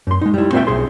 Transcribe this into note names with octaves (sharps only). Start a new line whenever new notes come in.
F#2 C6
G#3 D#4
G3 E4
C4 F4 F#4 C5 E5 G5
B1 G#4 C6